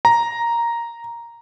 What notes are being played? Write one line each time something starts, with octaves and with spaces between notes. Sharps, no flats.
A#5